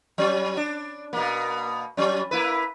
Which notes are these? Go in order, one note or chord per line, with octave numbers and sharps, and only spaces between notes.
F#3 C#4
D4
B2 A#3
F#3 C#4
A#3 E4 B4